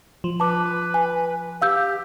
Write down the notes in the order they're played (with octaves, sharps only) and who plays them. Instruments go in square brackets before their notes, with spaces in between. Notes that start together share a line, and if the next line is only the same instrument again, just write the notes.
[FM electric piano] F3
[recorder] B4 [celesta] A5 D6
[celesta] G#5
[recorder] G4 [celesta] F5 E6 G6